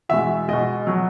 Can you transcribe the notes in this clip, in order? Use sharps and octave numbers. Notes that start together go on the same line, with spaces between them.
E2 B2 G#3 E5
B2 G#3 D#5
B2 F#3